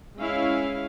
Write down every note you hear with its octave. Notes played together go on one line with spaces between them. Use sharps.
G#3 C#4 E4 F5